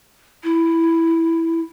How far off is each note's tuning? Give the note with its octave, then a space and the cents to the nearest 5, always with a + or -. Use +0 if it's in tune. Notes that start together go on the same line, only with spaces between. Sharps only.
E4 +0